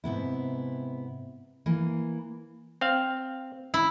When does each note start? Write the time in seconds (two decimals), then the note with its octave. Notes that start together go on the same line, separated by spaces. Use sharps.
0.04 G#2 C3 B3 E4
1.66 E3 A#3
2.81 C4 F5
3.74 E4